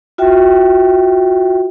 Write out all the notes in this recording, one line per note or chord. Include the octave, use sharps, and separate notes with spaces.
F4 F#4 E5 G5